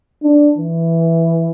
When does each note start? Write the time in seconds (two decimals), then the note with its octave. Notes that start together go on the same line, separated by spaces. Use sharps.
0.23 D4
0.58 E3